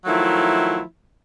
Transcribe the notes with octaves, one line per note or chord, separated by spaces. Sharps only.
D#3 F3 F#3 A3 E4 F4